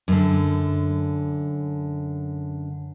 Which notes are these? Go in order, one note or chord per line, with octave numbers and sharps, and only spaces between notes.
F#2 D3